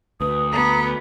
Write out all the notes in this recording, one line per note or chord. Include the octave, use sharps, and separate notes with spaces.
D2 B4 D#6
B3 A#5